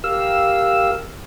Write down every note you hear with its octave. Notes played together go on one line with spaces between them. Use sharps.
G4 A#4 F5 E6